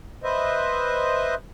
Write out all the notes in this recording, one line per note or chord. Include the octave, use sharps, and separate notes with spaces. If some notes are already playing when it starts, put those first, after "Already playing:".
B4 C5 D#5 E5